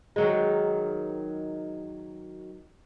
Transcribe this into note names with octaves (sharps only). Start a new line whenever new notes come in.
D#3 F#3 G#3